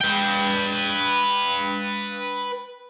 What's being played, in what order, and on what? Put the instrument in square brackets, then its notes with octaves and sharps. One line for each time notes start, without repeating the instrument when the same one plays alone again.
[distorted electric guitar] B4 G5